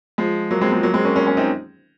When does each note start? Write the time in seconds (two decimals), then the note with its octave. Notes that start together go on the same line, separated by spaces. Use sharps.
0.18 F3 G#3
0.51 F#3 A#3
0.61 G#3 C4
0.72 F3 G#3
0.83 F#3 A#3
0.94 G#3 C4
1.05 A#3 C#4
1.16 A#3 C#4
1.26 A#3 C#4
1.37 C4 D#4